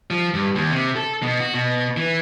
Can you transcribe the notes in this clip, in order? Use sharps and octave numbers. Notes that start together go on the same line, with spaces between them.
F3
G2
D#2
C3
A4
B2
F#4
B2
E3